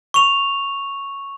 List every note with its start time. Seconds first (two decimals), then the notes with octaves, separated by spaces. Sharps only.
0.14 C#6 F7